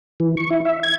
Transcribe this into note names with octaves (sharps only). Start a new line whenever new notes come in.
E3
C#6
E4
E5
G#6